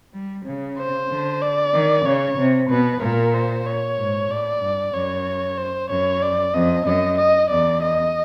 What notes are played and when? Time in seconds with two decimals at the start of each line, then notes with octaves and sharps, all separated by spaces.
0.14 G3
0.46 C#3
0.78 C5
1.09 D3
1.42 D5
1.74 D#3
2.06 C#3 C#5
2.38 C3
2.70 B2 B4
3.02 A#2 A#4
3.34 C5
3.66 C#5
3.98 G#2
4.30 A2 D5
4.62 G2
4.94 F#2 C#5
5.58 C5
5.90 F#2 C#5
6.22 D5
6.54 F2 D#5
6.86 F#2 D#5
7.18 D#5
7.50 E2 D5
7.82 D#5